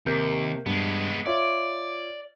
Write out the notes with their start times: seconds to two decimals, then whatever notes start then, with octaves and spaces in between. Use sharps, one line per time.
0.06 D#2 C3 A#4 G6
0.66 G2 G#3 B3
1.26 F4 C#5 D5 E5